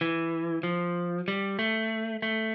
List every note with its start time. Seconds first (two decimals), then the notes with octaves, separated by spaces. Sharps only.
0.01 E3
0.63 F3
1.28 G3
1.59 A3
2.22 A3